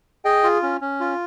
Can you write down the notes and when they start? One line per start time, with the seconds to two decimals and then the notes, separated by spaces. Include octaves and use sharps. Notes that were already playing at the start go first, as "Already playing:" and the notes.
0.25 G#4 D#5 G5
0.44 F4
0.62 C#4
0.81 C#4
1.00 F4